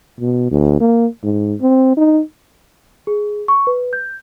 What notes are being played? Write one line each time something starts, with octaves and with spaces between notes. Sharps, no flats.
B2
D2
A#3
G#2
C4
D#4
G#4
C#6
B4
G6